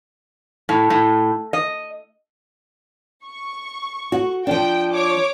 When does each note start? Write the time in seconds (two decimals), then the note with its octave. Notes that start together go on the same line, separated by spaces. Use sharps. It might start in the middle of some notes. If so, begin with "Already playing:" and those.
0.69 A2
0.90 A2
1.53 D#5
3.26 C#6
4.12 F#4
4.47 F3 D4 G5
4.93 C#5 D6